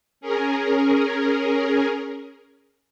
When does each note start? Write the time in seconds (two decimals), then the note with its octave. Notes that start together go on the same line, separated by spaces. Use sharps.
0.21 C#4 G#4 A#4